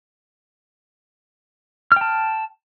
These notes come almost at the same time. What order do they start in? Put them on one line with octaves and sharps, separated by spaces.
F6 G5 A5